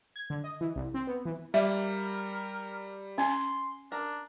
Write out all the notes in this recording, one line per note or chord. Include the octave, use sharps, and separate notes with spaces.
G#6
D3
D#5
E3
C2
C4
B3
E3
G3 A#3 A#4 E5
C#4 G#5 C6
D4 A#4